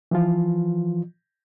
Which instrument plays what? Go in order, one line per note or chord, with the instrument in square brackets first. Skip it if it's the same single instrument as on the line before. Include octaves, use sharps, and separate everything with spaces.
[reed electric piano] E3 F3 F4